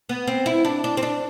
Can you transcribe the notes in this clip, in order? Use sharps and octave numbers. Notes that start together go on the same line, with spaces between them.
B3
C4
E4
D4
D4
C4
D4